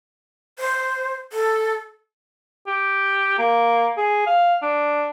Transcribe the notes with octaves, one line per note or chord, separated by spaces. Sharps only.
C5
A4
G4
A#3
G#4
F5
D4